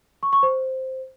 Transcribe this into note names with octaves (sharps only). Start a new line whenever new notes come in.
C#6
C#6
C5